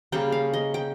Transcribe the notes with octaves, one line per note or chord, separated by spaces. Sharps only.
C#3 G3 A#3 G5
F5
D#5
G5